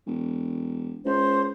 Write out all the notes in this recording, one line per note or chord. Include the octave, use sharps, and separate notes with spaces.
E1
C#2 C5